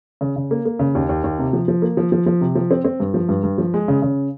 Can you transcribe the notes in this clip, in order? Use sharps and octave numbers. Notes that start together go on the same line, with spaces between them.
C#3
C#3
A#3
A#3
C#3
D#2
D#2
D#2
C3
F3
F3
A#3
F3
F3
F3
C3
F3
C4
C4
G2
F3
G2
G2
F3
G#3
C#3
C#3